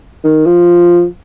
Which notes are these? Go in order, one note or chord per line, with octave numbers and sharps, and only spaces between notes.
D#3
F3